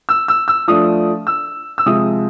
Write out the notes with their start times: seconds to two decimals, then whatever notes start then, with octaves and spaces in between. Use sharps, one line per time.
0.09 E6
0.28 E6
0.48 E6
0.68 F3 A3 D4 D#6
1.27 E6
1.78 E6
1.86 C3 F3 G#3 D#6